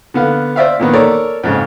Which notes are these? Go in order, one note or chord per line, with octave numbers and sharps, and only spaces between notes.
D3 B3 F5
C5 D5 E5 F5
A#2 D#3 B3
A4 A#4 C#5 D5
F2 G#2 C#3